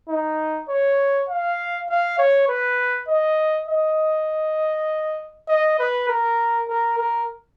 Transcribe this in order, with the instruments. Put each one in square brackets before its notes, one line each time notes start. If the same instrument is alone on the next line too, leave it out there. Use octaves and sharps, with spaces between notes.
[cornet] D#4
C#5
F5
F5
C#5
B4
D#5
D#5
D#5
B4
A#4
A#4
A#4